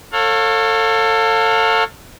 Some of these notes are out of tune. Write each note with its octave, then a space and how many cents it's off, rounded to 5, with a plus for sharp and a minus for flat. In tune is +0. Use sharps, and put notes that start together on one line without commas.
A4 +25 C#5 -20 F5 +30